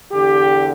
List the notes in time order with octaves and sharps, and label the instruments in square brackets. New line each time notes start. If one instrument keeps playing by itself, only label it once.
[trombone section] E2 D3 G4